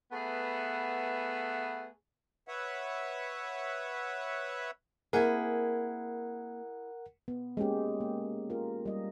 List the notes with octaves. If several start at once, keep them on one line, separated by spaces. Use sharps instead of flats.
A3 B3 G#4 B4 E5 F#5
B4 C#5 E5 F#5
A#3 C4 E4 G#4 A#4 F#5
B3
G#3 A#3 C#4 G4
A#3
F4 A#4
G3 D#5